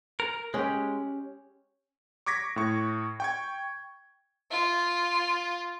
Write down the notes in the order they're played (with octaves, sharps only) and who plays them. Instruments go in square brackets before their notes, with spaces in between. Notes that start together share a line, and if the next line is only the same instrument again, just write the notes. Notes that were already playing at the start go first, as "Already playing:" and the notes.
[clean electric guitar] A#4
[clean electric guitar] G#3 [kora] C#4 G4
[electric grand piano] C#6 D6 G#6 A#6 B6
A2 C#6
G5 C#6 G#6
[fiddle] F4